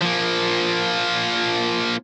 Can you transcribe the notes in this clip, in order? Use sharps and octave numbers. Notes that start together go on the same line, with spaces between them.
F3 A#3